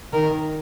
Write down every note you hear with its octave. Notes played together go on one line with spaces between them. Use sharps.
D#3 A#4